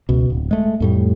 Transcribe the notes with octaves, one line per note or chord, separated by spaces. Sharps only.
C#2 B2
D1
G#3 A3
F2 A2 G3